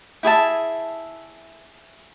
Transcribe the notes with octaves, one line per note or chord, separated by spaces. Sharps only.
E4 G#4 E5 A5